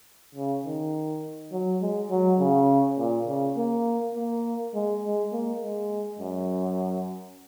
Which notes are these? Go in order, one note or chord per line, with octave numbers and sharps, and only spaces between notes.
C#3
D#3
F#3
G#3
F#3
C#3
A#2
C#3
A#3
A#3
G#3
G#3
A#3
G#3
F#2